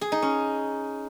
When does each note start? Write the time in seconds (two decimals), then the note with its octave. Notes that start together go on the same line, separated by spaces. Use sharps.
0.01 G#4
0.12 D#4
0.22 C#4